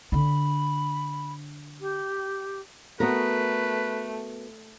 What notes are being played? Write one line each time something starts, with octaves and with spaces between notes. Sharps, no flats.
D3 D4 B5
G4
A3 B3 F#4 A#4 B4